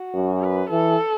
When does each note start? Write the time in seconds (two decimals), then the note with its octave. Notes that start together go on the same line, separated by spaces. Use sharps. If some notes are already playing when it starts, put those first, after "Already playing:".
Already playing: F#4
0.15 F#2
0.42 B4
0.70 E3 A4